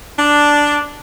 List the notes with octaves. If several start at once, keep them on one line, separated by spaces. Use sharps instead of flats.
D4